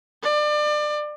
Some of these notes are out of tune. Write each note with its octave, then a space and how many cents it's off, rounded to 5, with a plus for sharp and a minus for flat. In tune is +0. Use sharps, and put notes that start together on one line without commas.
D5 +30